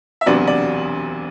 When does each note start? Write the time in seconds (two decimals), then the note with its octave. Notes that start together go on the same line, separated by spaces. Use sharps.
0.21 E5
0.26 E1 D2 C3 F#3 B3 D5
0.47 D5